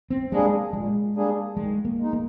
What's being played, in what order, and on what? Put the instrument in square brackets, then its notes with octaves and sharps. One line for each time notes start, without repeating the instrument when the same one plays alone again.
[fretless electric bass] C4
[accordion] G3 A#3 D4 G#4 [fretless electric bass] G#3
[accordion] A#2 [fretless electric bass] G#3
[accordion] G3 A#3 D4 G#4
[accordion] D#3 [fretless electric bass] G#3
[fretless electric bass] A#3
[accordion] G#3 D#4
[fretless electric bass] A#3